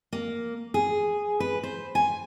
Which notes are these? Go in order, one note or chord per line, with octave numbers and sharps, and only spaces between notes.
A#3
G#4
B4
C5
G#5